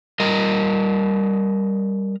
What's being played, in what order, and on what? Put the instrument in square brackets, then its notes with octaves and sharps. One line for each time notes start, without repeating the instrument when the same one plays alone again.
[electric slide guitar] G3 A#4 D#5